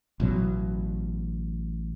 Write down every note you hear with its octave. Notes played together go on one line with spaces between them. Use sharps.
A1 B2 F#3